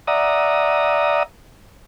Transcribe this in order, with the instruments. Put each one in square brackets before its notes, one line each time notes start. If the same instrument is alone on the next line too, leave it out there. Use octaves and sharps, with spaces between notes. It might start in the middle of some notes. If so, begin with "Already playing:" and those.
[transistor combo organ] D5 E5 F#5 A#5 D#6